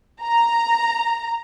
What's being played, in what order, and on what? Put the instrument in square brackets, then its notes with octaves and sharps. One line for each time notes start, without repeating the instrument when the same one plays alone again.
[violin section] A#5